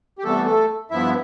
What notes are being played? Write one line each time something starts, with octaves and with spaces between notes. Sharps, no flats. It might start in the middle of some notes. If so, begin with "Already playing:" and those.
G4
C3 E3 G3 A3 B3 A4
A3 A4
G2 F3 B3 E4 E5